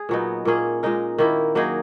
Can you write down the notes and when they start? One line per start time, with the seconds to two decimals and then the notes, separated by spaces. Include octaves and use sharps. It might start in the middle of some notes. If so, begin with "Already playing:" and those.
Already playing: G#4
0.09 A#2 F#3 B3 D#4
0.45 A#2 A#3 C#4 G#4
0.83 A#2 G#3 D#4 A#4
1.18 D#3 A#3 E4
1.55 F#3 A#3 D#4 G#4